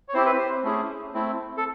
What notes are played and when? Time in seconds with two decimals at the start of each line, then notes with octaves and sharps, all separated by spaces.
0.09 C#5
0.14 C4 E4 G4 C5
0.26 B4
0.38 C5
0.64 A3 C#4 E4 G#4
1.14 A3 C4 E4
1.57 A4